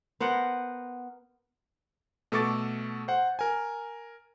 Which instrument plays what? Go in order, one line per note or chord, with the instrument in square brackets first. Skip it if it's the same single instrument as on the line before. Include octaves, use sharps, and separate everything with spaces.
[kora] B3 A#4 C5 F#5
[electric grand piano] B2 A3 A4 C#6 D6 A6
C5 F#5
A#4 G#5